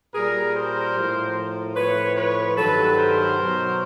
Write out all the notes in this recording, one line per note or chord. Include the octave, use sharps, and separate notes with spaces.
A#2 G3 G#4 A#4
A#4 C5
A2 F3
A2 F3 B4 C#5
B4 C#5
G2 D#3 F#3 A4 B4
A#4 C5
B2 F#3